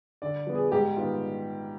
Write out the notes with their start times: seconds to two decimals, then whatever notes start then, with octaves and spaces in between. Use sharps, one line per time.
0.22 D3 D5
0.47 F3 B3
0.55 G#4
0.72 G#2 G4
0.97 D#3 B3 F4